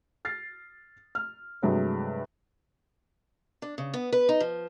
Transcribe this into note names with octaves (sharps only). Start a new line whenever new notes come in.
F6 A6 C7
F6
G2 C3 F#3 G#3 A3
D4
C#3
B3
B4
D#4
F3